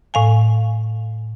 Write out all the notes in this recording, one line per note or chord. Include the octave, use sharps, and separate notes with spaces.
A2 F5 G#5